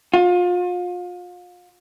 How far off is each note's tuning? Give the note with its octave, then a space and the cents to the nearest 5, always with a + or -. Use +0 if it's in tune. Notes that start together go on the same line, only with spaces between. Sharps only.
F4 +35